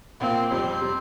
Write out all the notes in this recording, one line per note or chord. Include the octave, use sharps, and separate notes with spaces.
A#2 A#3 C4 F4
F2 C3 G3 C4
C3 G3